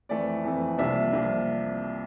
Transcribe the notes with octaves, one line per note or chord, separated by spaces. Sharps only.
F2 E3 A3 C4 D5
F2 E3 A3 C4
C2 C3 F3 A#3 D4 E5
C2 C3 F3 A#3 D4